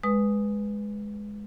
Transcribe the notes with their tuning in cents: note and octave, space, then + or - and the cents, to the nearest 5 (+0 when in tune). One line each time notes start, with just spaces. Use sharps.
G#3 +0 B4 +0 D#6 +0